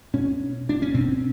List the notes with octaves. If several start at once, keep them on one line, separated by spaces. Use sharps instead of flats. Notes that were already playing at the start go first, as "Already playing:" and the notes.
B2 C#4
D4
C#4
B2 C4